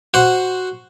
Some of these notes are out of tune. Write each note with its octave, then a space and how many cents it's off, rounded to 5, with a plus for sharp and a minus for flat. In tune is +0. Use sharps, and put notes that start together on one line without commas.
F#4 +0 C5 +0 F#5 +0